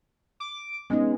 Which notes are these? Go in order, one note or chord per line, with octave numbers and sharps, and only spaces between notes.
D6
G#3 B3 C#4 D#4